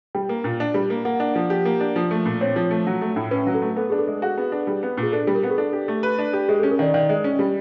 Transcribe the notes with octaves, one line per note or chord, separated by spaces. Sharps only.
G3 G5
A#3
A#2
D4
G3
A#3
A#3 F#5
D4
F3
G4
A#3
D4
F3
A3
A#2
C4 C#5
F3
A3
F#3
A3
A2
C#4 B4
F#3
A4
A3
B3 A4
D4 G#4
A4
G#3
F#4 G#4
B3
D4
G3
B3
A#2
G#4
D4 A4
G3
A#4
B3
G#4
D4 A4
G4
A3
B4
D4
G4
G#3 G#4
A4
C#4
A#4
D#3 D5
D#3 D5
G#3
C#4
G3